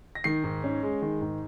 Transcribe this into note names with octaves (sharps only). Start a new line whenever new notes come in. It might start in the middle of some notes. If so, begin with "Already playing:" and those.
A#6
D#3 C7
G#2
C#4
G#3
D#3
G#2